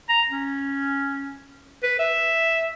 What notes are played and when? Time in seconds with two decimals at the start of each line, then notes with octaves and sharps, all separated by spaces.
0.09 A#5
0.30 C#4
1.83 B4
1.99 E5